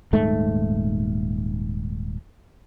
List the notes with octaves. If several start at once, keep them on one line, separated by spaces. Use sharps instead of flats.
D#1 G#2 A3